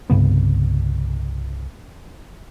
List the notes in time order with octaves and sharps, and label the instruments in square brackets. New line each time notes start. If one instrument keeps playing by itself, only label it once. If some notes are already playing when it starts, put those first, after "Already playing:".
[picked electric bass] C2 G2 C#3 B3